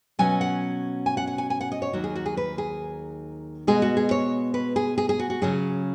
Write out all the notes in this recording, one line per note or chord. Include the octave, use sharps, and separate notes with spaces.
B2 F#3 C#4 G#5
F#5
G#5
F#5
F#5
G#5
G#5
F#5
D#5
C#5
D#2 D#3 F#3 F#4
G#4
F#4
G#4
B4
G#4
B2 G#3 B3 G#4
F#4
G#4
C#5
B4
G#4
G#4
G#4
F#4
F#4
C#3 F#3 C#4 G#4